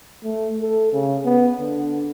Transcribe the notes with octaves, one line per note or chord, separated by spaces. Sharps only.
A3
A4
C#3
B3
D3